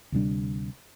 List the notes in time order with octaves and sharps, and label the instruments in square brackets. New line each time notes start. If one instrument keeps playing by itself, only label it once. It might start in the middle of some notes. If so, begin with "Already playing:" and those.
[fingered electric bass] D2 C3 G3 D4